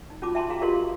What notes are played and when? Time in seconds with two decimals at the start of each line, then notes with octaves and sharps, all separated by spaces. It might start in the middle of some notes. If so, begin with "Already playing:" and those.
0.10 D#4
0.22 C#4 F4 F#4 A5 B5 D6
0.35 E5 G5 A5 B5 C6
0.49 E4 F#4 G#4 F5 A#5
0.61 F4 G4 A#4 D#5 F5 C6